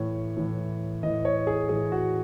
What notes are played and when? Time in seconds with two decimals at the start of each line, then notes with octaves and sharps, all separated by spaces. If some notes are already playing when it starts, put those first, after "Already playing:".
Already playing: A2 E3 C#5
0.37 A2 E3
1.03 A2 E3 D#5
1.25 C#5
1.47 G#4
1.69 A2 E3 G#4
1.92 F#4